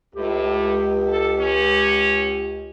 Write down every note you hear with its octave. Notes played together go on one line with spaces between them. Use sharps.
C#2 A2 G4
A4
C#4